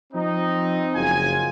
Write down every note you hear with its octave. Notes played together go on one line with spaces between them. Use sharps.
F3 C4 D#4
F#1 F4 G#5